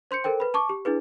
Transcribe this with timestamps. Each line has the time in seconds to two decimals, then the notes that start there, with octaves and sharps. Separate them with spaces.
0.11 C5 C6 G6 C#7
0.24 A4 A#4 C5 G5
0.40 B4 B5
0.54 A5 C#6 D6
0.69 G4
0.85 D4 E4 G#4 B4